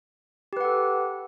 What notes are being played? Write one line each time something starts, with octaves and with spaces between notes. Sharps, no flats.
G4 A4 B4 F#5